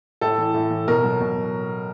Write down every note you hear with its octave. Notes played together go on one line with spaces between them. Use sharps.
A2 A4
E3
A2
E3
B2 A#4
F#3
B2